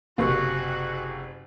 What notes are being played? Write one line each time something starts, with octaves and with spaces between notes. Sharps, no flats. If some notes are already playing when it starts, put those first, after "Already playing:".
F#1 C3 A#3 F#4 C#6